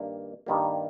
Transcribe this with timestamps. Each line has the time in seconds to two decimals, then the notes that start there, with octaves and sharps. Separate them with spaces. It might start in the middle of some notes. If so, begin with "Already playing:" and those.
Already playing: G2 D#3 G3 A#3
0.46 G2 D#3 G3 A#3